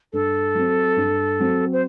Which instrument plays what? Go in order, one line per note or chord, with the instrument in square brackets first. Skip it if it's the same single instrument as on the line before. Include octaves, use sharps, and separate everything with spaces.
[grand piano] G2 [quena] A4
[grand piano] F#3 C4
G2
F#3 C4
[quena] C5